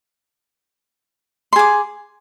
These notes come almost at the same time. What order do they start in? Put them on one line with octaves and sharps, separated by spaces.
C6 G#4 D6